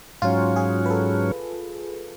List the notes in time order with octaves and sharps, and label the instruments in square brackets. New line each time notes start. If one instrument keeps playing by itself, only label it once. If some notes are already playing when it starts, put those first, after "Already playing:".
[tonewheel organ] G#2 F#3 C#4 [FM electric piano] F4
[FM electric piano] G#4
B4
A4